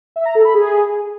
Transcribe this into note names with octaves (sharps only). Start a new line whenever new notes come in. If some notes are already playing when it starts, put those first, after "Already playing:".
E5
A#5
A4
B5
G#4